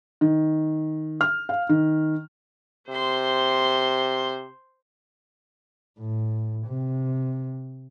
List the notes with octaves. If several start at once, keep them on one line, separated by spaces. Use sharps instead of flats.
D#3
F6
F5
D#3
C3 C5 C6
A2
C3